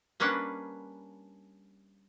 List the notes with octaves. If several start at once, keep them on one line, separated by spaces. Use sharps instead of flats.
G3 A#3 C#4 D4 B4 F#5